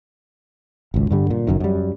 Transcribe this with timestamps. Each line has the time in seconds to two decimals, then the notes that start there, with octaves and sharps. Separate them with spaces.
0.94 G#1 C#2
1.11 G2 D3 G3
1.30 A#2
1.47 F#1 F#2 D#3
1.60 F#2 G3